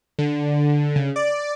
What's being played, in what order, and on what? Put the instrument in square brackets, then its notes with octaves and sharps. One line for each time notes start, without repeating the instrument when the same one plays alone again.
[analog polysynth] D3
C#3
D5